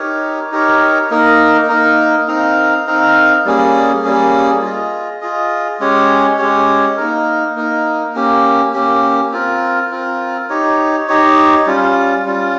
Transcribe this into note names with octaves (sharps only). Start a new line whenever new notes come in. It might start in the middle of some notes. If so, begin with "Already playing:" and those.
Already playing: D#4 G4 A#4 C#5
D#4 G4 A#4 C#5
A#3 D#4 A#4
A#3 D#4 A#4
C4 D#4 A#4 F5
C4 D#4 A#4 F5
G3 A#3 C#4 G#4
G3 A#3 C#4 G#4
F4 G#4 D#5
F4 G#4 D#5
G#3 C#4 G4 C#5
G#3 C#4 G4 C#5
A#3 D#4 A#4
A#3 D#4 A#4
A#3 C#4 G4
A#3 C#4 G4
C4 F4 A#4
C4 F4 A#4
D#4 G4 C#5
D#4 G4 C#5
G3 C#4 F4
G3 C#4 F4